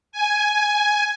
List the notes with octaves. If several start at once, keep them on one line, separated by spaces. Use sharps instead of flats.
G#5